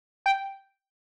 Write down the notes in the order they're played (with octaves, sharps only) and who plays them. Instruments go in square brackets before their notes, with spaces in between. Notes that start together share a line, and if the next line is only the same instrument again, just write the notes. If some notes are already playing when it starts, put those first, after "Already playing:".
[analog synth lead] G5